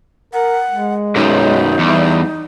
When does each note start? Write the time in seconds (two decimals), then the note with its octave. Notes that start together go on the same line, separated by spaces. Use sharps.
0.33 A#4 F#5
0.70 G#3
1.16 B1 F#2 D#4
1.79 E2 G3